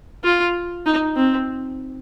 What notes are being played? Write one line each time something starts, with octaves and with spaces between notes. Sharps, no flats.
F4
D#4
C4